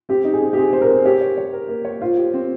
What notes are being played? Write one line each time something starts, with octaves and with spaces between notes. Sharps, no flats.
C4 G4
D#4
G#4
C4
G4
C4 G#4
C5
A#4
C4
G4 C#5
C#5
C#5
A#4
A#3
C#5
F4 C5
G4
C4